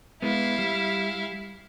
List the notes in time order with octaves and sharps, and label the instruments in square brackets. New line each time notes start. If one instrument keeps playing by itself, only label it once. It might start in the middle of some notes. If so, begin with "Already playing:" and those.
[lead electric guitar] G#3 B3 [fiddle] E4 F5
[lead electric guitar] G3